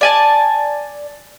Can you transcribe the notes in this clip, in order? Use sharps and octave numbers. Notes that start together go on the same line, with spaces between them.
D5 G#5 A5